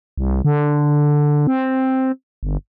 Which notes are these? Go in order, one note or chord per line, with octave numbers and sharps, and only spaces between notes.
C2
D3
C4
G1